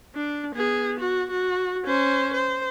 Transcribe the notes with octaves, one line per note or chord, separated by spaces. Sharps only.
D4
B3 G#4
F#4
F#4
C#4 C5
C5